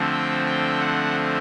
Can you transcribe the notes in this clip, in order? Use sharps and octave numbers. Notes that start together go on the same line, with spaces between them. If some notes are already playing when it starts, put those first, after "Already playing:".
Already playing: D3 F3 A3 C4
G5
G5
F#5